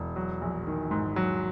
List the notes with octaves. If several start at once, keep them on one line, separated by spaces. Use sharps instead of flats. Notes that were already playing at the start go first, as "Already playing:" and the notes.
Already playing: E1
F#3
A#1
D#3
G#2
F#3